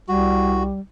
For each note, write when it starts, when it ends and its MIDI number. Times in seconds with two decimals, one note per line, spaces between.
0.08 0.74 36
0.08 0.79 55
0.08 0.63 66